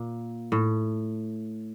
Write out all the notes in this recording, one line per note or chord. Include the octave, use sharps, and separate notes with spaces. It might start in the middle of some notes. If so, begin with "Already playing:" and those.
Already playing: A#2
A2